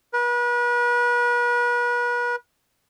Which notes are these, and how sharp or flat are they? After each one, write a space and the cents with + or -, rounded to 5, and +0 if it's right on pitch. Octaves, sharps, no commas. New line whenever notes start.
B4 -35